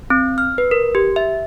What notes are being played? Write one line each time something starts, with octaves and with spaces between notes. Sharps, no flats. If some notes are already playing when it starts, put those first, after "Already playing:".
C4
F6
B4
A#4
G4
E5